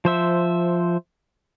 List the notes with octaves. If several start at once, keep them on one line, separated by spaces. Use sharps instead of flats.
F3 C5 E5